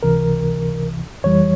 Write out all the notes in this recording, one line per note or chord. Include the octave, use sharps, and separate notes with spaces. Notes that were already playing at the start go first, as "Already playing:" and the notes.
C#2 C3 E3 A#4
F2 E3 G3 C#5